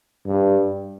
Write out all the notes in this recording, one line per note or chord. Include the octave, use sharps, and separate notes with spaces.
G2